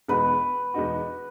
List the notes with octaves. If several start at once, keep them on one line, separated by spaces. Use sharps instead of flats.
E2 B2 G#3 D#4 F#4 B4
E2 B2 G#3 D#4 F#4